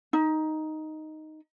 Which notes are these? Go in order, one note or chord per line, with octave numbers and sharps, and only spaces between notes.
D#4